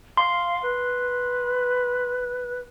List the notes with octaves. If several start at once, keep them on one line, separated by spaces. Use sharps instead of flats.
F5 C6
B4